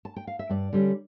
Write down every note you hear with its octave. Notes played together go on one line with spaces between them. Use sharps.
A5
G5
F5
E5
G2 D5
D3 G3 C#4